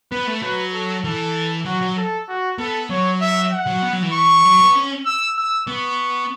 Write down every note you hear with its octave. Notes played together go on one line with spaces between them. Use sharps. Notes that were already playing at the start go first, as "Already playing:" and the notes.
B3 B4
A3
F#3 B4
A4
E3 A4
F#3 F#4
F#3
A4
F#4
B3 A4
F#3 C#5
E5
F#5
F#3
B3
F#3
E3
C#6
F#3
B3
C#4
E6
E6
B3 C#6